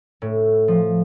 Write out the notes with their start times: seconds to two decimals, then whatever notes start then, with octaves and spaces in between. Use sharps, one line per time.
0.22 A2
0.68 F3